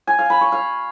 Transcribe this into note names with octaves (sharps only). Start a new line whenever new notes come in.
G#5
F5
B5
C#6
F5